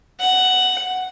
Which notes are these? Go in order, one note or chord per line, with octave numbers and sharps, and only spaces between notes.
F#5